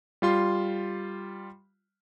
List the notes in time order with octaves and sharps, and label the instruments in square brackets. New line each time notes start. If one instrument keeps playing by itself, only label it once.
[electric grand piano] G3 F4 C6